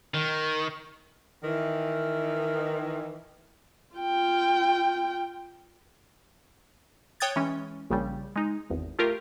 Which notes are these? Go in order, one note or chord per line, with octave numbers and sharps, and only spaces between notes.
D#3
D#3 E3
F4 G5
C#5 G5 D#6 F#6 G#6 A6
E3 G#3 C#4
A#1 C#3 G3
G#3 D#4
G#1 E2
A3 F4 G4 A#4